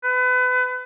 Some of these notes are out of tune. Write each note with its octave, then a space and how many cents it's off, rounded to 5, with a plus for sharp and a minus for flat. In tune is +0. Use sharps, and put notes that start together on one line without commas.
B4 +30